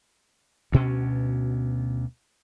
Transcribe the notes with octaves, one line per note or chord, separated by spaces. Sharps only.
D2 B2 C#4